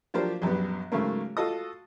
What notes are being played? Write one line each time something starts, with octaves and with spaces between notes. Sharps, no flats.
F3 F#3 A#3 D4 G4 C5
A#1 F#2 G3 B3
G#2 C#3 F#3 A3 A#3
F4 F#4 A4 D#5 D#6